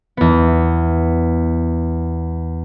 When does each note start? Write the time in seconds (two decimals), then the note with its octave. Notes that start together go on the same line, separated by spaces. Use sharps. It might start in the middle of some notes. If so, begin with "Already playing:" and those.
0.17 E2 B3